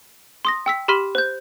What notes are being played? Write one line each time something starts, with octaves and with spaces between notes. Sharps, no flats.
C6 D#6 A#6
G5 E6 B6
G4 B5 C6 F6 B6 D#7
C5 G6